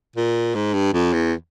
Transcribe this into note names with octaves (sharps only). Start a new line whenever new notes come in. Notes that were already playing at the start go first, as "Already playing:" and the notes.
A#2
G#2
G2
F2
E2